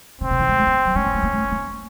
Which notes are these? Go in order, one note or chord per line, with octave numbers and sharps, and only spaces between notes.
C#3 C4
C3
E3
G#3
A3
A#3
F#3
G#3 C#4
A#3
A3
A#3
A3
A#3